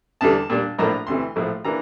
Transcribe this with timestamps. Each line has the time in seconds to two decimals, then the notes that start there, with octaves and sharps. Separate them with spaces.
0.21 E2 D3 G3 A5
0.50 A#2 G3 D4
0.78 A#1 A2 F3 A#3 D4 A#5
1.07 D2 C3 E3 C6
1.36 A#1 A2 F3 A3
1.65 E3 A#3 D4 A#5